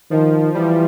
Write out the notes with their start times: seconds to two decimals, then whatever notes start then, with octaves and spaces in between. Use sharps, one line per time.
0.11 D#3 F3
0.55 E3 G3